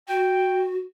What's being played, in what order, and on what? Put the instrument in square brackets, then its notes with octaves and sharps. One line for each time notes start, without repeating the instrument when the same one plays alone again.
[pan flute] F#4 [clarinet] G5